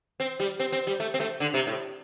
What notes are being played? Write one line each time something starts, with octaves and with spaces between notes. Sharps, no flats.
C4
G3
C4
C4
G3
A3
C4
A3
D3
C3
A2